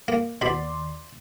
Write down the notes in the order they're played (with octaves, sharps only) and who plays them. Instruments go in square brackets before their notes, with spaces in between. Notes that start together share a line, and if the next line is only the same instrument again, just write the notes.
[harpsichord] A#3
[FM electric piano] D#2 D5 C6 [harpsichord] B2 C5 B5